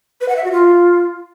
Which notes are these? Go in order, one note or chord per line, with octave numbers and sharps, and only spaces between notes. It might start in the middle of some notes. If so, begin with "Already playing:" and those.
B4
F#5
E5
F#4
F4